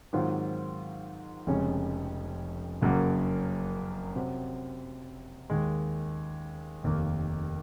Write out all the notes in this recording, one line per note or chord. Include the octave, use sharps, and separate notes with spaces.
G#2 D#3 F#3 C4 F4
F1 F2 C#3 G#3 C#4
F#1 F#2 C#3 F#3 A#3
C3 F#3 C4
D#2 D#3 G#3
F1 D#2 D#3 A#3